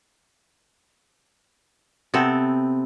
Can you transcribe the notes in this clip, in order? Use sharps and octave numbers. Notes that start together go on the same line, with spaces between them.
C3 B3 C4 A4